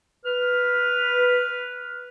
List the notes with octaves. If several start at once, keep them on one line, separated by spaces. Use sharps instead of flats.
B4 F6